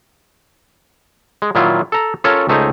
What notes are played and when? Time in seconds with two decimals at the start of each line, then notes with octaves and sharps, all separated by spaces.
1.42 G#3
1.55 A#2 D#3 F#3 E4 F4
1.92 A4 A#5
2.24 C#4 F4 A4 A#4 C#5
2.49 C#2 A3 D#4 C5 G#5 A#5